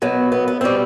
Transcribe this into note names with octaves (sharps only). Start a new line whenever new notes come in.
B2 F#3 B3
B3
B3
B2 G3 C4